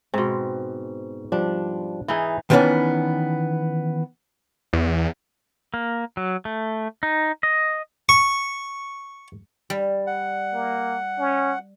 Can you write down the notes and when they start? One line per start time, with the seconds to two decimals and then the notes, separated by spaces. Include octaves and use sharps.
0.14 G#2 B2 C4
1.32 F3 G3 D4
2.08 E3 D#4 E4 G#4
2.50 D#3 E3 A3 B3 C#4 D4
4.73 E2
5.74 A#3
6.17 F#3
6.45 A3
7.03 D#4
7.43 D#5
8.09 C#6
9.70 G3
10.07 F#5
10.53 A#3
11.19 C#4